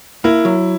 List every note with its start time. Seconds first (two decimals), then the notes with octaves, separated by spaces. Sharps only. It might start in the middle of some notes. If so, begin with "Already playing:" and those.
0.24 A#3 E4
0.45 F#3